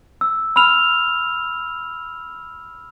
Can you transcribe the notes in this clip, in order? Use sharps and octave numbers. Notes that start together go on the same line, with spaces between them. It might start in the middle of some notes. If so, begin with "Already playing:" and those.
E6
B5 E6 F6 F7